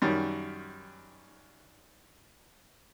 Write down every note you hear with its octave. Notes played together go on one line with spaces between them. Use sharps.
F#2 D#3 G3